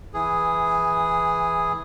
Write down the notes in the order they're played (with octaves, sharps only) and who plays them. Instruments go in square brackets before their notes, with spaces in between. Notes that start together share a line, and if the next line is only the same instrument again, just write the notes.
[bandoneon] E3 G#4